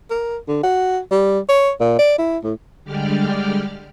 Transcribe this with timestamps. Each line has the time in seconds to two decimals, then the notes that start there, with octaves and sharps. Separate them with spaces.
0.10 A#4
0.48 D3
0.64 F#4
1.11 G3
1.49 C#5
1.80 A#2
1.99 D5
2.18 E4
2.44 A2
2.84 D3 G3 G#3 G4 D5 F6